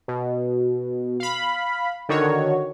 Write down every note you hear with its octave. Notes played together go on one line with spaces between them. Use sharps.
B2
F5 B5
D3 D#3 F#4 C#5